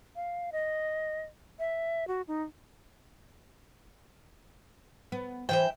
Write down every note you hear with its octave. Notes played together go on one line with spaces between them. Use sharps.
F5
D#5
E5
F#4
D#4
B3
E3 C5 E5 G5